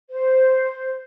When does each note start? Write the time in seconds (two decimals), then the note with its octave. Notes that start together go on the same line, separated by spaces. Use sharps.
0.10 C5